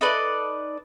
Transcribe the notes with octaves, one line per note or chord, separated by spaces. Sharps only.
D#4 A4 B4 D5